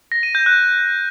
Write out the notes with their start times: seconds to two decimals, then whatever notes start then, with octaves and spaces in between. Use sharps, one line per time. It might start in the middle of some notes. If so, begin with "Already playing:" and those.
0.12 A#6
0.23 D#7
0.35 G6
0.46 F#6